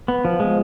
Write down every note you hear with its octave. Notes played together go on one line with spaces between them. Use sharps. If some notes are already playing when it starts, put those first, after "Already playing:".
B3
F3
G#3